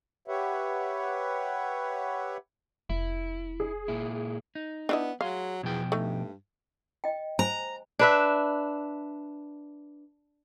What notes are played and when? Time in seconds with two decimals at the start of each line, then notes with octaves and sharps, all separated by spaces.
0.28 G4 B4 C#5 E5 F#5
2.90 F1 E4
3.60 G#4
3.88 A#2 E4
4.55 D#4
4.89 B3 D4 E4 D#5
5.21 F#3 G#4 F5 C6
5.63 E2 B2 F3 G5
5.92 G2 A3 D#4
7.04 D#5 G5
7.39 C5 G#5 A#5
7.99 D4 B4 E5